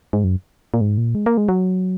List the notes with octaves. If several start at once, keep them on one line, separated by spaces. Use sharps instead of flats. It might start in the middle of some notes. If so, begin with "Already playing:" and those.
G#2
F#2
A#2
G#2
A#2
G#3
A#3
G#3
F#3